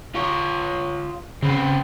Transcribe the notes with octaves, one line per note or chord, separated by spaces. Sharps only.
F4 C#5
C#3 C4 B4